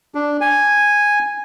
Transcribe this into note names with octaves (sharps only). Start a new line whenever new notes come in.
D4
G#5